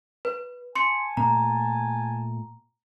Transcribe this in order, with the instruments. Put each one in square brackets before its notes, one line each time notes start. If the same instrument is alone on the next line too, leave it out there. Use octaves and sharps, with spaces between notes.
[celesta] B4
[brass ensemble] G#5 A5 [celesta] C6 C#7
[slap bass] A#2 A3 [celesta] A#5